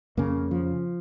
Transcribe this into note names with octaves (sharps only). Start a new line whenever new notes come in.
F2 C#3 A#3
F3